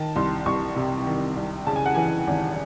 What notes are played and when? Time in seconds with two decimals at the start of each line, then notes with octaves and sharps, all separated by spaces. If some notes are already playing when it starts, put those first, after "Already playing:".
Already playing: D#3 A5
0.16 C2 C6
0.46 C2 C#6
0.76 C3
1.06 D#3
1.37 C2
1.67 C#3 A5
1.76 G#5
1.86 F#5
1.95 E3 G#5
2.27 G#1